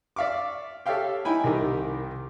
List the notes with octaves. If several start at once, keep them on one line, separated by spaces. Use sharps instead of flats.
D5 E5 F5 C#6 D6
G4 A4 C#5 E5 F5 G5
D#4 E4 G5 G#5 B5
C2 D#3 G4 A#4